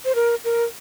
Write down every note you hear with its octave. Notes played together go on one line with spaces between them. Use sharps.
C5
A#4
A#4